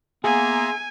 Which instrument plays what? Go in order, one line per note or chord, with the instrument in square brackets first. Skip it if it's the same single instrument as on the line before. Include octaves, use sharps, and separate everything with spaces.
[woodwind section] A#3 B3 [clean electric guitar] G#4 [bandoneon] E5 A#5 C6 [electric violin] G#5